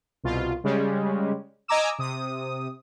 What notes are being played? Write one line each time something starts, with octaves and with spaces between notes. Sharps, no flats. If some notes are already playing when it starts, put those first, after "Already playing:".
C2 B2 F4
C#3 G3 G#3 C#4
D#5 G#5 A#5 D6 E6
C3 D#6